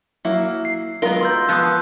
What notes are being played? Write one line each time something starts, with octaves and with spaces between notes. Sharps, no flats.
F#3 A#3 E4
C7
F#3 G#3 B3 F4 A#4 G7
C6 E6 G6
F3 B3 D#6 F#6